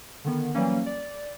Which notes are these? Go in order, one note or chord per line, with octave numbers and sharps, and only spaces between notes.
D3 D#3 B3
E3 F#3 G3 A#3 C#4
D5